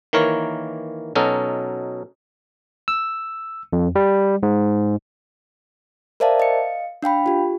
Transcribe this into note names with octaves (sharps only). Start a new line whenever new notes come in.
D#3 E3 A#3 A#4 C#5
B2 F#3 C#4 D#4 A4
E6
F2
G3
G#2
A#4 C5 D5 E5 F5 A5
D#5 F5 C#7
D4 F5 G5 B5
F4 G4